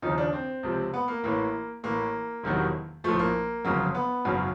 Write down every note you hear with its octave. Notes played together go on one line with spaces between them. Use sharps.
D#2 C#3 F3 D#4
D4
C4
C#2 C3 F3
B3
A#3
A1 A2 E3 A#3
A1 A2 E3 A#3
E1 E2 C3 D#3 F#3
A#1 A2 F3 A3
A#3
G1 F2 C#3 F#3
B3
G#1 F#2 C#3 F#3